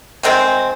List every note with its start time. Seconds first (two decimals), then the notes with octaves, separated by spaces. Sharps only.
0.23 C3 D#3 G#3 C4